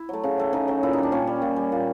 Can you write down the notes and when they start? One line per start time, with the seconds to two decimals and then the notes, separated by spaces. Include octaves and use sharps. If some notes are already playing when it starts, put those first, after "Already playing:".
Already playing: E4
0.09 F#3 A3
0.24 C#3
0.38 F#3 A3
0.53 C#3 D#4
0.68 F#3 A3
0.83 A#2 E4
0.93 G3 D#4
1.03 D4
1.12 A#2 C#4
1.27 G3
1.42 A#2
1.56 G3
1.72 A#2